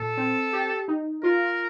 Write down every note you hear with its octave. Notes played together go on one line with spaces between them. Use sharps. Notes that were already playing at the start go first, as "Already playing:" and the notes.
Already playing: A#2 A4
C4
G4
D#4
F4 A#4